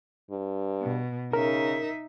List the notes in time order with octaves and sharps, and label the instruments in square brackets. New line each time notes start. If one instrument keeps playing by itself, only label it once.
[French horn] G2
[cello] B2
[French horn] C#3 [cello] D#4 E5 [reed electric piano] A#4